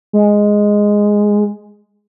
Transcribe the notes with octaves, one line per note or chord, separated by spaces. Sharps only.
G#3